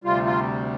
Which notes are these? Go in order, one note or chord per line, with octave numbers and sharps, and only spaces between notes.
D2 C3 G3 F4
F4